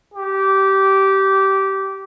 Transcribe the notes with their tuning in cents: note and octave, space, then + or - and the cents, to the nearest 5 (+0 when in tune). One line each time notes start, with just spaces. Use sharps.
G4 -15